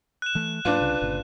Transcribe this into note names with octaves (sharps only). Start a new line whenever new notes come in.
F#6 E7
E3 A3
G#2 F#3 A#3 D4 F4 B4
C2 C#3
G1 A#2 C#3